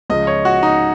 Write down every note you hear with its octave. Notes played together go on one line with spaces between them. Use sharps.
C#2 C#3 F3 D#5
C#5
F#4
D#4